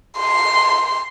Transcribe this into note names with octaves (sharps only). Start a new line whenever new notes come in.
C6